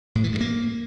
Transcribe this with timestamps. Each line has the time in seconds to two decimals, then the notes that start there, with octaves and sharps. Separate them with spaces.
0.15 A2
0.24 E3
0.32 G2
0.41 A#3